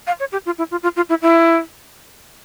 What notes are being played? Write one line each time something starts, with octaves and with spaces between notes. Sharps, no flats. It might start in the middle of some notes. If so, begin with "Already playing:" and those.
F5
C#5
G4
F4
E4
F4
F4
F4
E4
E4